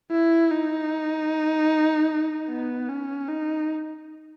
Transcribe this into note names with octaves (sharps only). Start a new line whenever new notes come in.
E4
D#4
B3
C#4
D#4